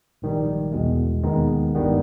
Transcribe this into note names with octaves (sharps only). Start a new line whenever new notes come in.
A#1 G#2 D#3 G3
E2 B2 G#3
D#2 D#3 G#3 B3 D#4
G#1 G2 D#3 G3 B3